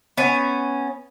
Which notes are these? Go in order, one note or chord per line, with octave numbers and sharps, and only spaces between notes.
B3 C#4 G#5